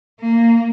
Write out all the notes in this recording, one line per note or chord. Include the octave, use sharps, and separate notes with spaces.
A#3